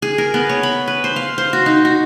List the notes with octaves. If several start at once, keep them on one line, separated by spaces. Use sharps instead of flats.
G#4
A#4
B3
C#5
B5
B4
C5
F5
C5
F#4
D#4
F#4